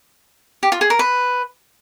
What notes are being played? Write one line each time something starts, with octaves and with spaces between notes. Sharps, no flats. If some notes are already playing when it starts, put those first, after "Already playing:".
G4
F4
G#4
A#4
B4